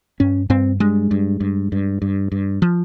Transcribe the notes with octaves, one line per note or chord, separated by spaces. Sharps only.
G2 C#4
G2 C4
G2 G#3
G2
G2
G2
G2
G2
F3